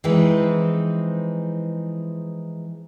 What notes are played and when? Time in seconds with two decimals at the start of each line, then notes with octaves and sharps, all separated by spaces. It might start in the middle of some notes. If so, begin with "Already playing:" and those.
0.04 E3 F3 G#3 C4 D#4 B4